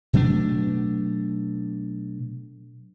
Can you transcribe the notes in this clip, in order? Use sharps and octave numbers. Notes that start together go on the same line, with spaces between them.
B2 F#3 A3 D4